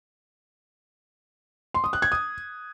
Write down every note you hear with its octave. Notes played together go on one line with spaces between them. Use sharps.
C6
D#6
F#6
G#6
D#6